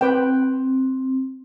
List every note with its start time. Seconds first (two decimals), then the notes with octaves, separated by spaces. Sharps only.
0.01 C4 B4 G5